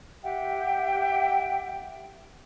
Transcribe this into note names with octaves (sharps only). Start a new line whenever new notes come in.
G4 E5 F#5 G5